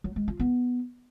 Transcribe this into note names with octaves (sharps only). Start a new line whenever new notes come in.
F#3
G#3
F4
B3